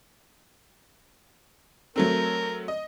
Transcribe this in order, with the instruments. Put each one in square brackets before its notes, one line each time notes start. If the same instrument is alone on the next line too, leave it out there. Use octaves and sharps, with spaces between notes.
[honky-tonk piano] F#3 A3 C4 [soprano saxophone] A#4
[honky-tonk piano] D#5